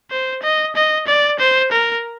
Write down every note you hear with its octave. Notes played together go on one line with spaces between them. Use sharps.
C5
D#5
D#5
D5
C5
A#4